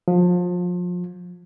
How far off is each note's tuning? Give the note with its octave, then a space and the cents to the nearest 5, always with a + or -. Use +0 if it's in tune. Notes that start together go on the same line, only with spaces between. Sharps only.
F3 +30